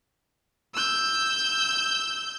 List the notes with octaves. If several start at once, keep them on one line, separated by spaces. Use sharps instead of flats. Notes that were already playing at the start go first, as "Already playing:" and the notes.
E6 G6